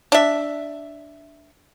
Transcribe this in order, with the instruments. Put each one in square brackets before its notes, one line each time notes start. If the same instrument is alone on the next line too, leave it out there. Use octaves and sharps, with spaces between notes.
[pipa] D4 E5